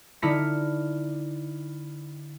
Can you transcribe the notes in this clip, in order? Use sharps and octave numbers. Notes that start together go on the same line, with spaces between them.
D3 D#4 E4 F6 B6 C#7